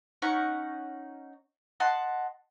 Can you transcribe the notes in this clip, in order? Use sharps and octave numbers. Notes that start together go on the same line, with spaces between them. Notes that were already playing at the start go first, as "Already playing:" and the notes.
C#4 D#4 F#5 C#6
D#5 F#5 A5 C6